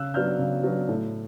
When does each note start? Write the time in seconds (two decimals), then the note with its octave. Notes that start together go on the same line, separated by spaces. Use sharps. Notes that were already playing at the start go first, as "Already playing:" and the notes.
Already playing: C#3 E6 F#6
0.14 F#3 B3 D4 F6 G6
0.39 C#3
0.64 F#3 B3 D4
0.89 A2